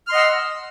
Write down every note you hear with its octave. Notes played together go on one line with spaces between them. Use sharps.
D#5 F#5 C6 E6 F6